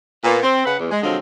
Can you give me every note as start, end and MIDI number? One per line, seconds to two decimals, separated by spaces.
0.24 0.39 46
0.24 0.39 59
0.43 0.64 60
0.66 0.78 49
0.66 0.78 71
0.66 0.78 78
0.79 0.91 40
0.91 1.02 56
1.03 1.17 50
1.03 1.17 53
1.03 1.17 54
1.03 1.17 56
1.03 1.17 60
1.03 1.17 65